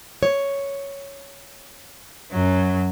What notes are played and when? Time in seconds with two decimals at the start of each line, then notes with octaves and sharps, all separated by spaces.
0.23 C#5
2.32 F#2 F#3